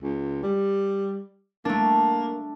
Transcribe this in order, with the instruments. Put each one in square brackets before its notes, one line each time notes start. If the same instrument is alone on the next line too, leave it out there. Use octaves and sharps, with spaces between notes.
[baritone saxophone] C#2
G3
[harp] A3 D4 [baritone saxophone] A#3